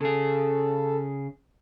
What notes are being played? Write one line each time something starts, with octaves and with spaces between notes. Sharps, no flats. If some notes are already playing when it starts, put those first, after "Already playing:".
C#3 G#4 A4